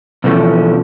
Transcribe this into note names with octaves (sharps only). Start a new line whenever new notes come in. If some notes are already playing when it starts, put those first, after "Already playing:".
B2 D3 E3 F3 A3 C#4